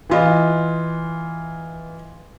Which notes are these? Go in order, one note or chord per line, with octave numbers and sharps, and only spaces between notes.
E3 F4 D#5